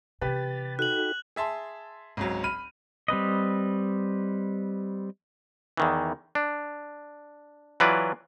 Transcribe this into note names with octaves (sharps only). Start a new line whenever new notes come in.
C3 E3 G4 B4 A6
D#4 F#4 A4 F#6 F#7
G#4 E5 A5 C6
G#1 C#2 F#3
B5 F6 D#7
G3 C4 B4 D#5
E2 D#3 E3
D4
E3 F#3 F4 B4 D5